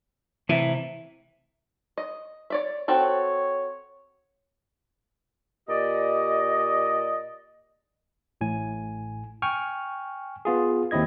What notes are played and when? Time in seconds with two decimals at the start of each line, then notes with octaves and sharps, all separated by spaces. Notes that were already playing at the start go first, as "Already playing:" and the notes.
0.49 A2 C3 E3 E5
1.98 D#5
2.50 C#5 D5 E5
2.88 C4 F#4 A4 C#5
5.69 A#2 G4 D5 D#5
8.41 A1 A2 G#5
9.42 G5 G#5 C#6 F6
10.45 B3 F4 G#4
10.91 D#2 C4 E4 D#5 G#6